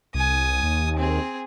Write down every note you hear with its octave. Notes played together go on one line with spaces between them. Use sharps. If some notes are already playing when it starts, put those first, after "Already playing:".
C2 G#5 D#6
D#2
C4 G#4